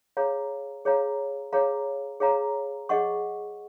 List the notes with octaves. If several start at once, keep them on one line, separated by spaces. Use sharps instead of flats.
G#4 C#5 F5 A#5
G#4 C#5 F5 A#5
G#4 C#5 F5 A#5
G#4 C#5 F5 A#5
G#4 D#5 F#5 C#6